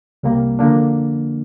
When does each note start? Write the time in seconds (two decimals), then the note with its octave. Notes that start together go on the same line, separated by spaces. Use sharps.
0.23 C2 C3 G3 A#3
0.59 F2 D3 F3 A#3 D4